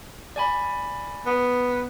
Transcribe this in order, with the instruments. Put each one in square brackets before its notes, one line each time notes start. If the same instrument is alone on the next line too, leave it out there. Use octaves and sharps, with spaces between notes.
[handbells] D5 G#5 B5
[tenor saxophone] B3